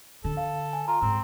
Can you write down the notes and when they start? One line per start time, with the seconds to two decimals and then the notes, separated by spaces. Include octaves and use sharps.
0.24 D3 A4
0.37 F5
0.73 G#5
0.88 F4 A#5
1.02 G#2 C4